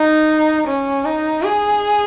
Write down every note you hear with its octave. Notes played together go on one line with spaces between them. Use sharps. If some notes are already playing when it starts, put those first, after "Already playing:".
Already playing: D#4
C#4
D#4
G#4